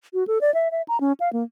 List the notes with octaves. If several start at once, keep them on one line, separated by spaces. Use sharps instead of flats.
F#4
A4
D5
E5
E5
A#5
C#4
F5
A#3